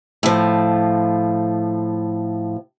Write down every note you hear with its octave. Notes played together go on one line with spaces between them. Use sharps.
A2 F3